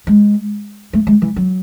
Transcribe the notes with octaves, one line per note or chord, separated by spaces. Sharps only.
G#3
A3
G#3
E3
F#3